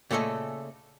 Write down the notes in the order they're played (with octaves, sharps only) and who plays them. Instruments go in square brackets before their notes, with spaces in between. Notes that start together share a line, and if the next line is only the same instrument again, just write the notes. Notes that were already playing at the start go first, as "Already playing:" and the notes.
[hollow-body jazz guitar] A#2 C#3 A3 A4 D#5 G#5